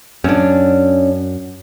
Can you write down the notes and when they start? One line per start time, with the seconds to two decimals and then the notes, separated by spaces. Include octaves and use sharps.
0.24 F#2 C#4 D4